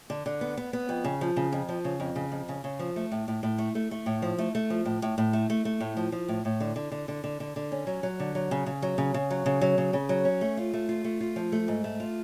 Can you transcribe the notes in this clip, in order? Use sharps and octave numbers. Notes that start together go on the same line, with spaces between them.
D3
D3
B3
B3
B3
F2
C#3
F3
C#3
F2
F3
C#3
F2
C#3
F2
C#3
C#3
F3
A3
A2
A2
A2
A3
A3
A3
A2
F3
A3
A3
F3
A2
A2
A2
A3
A3
A3
A2
F3
F3
A2
A2
D3
D3
D3
D3
D3
D3
D3
C#4
F#3
F#3
D3
F#3
C#3
C#3
F#3
C#3
C#3
F#3
C#3
F#3
C#3
C#3
F#3
C#4
A3
F4
A3
F4
A3
F4
F3
A3
G#2
A3
F4